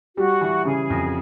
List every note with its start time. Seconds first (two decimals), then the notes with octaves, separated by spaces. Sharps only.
0.17 G3 F#4
0.41 E3
0.65 C#3 G#4
0.90 F2